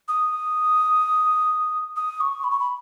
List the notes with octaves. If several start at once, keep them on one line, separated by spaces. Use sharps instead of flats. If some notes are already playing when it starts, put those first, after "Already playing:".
D#6
D#6
C#6
B5
C#6
B5